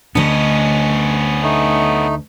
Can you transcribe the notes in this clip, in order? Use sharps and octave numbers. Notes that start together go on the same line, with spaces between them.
D2 D3 B3 C#4 D4 D#5
A3 D#4